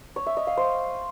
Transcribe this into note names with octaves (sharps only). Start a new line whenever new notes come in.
C#5
E5
D#5
F5
C5